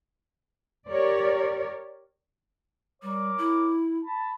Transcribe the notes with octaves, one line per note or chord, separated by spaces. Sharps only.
G4 A#4 C#5 D5
G3 A#4 C#5 D6
E4
A5 B5